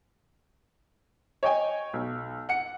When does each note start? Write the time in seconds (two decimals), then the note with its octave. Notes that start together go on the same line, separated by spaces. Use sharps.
1.43 C#5 D#5 G5 G#5
1.93 B1
2.49 F#5 C#7